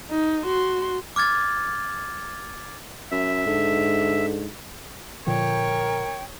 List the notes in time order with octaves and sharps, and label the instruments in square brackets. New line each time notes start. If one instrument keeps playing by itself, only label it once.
[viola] D#4
F#4 C6
[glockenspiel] D6 F6 G#6 A6
[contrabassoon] F#2 [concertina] E5
[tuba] G#2 [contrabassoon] D3
[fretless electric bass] A#2 D3 F3 [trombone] A#4 [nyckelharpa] C#5 [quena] G5